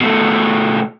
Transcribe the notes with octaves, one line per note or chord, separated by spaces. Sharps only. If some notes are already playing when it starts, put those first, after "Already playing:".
B2 A3